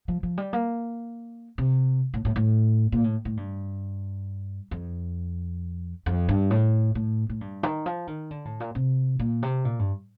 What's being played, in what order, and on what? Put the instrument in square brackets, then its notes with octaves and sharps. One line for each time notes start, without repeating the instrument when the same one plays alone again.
[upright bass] F3
F3
G3
A#3
C3
A2
A2
A2
A#2
A2
A2
G2
F2
F2
G2
A2
A2
A2
G2
D#3
F3
D#3
D3
A2
A#2
C3
A#2
C3
A#2
G2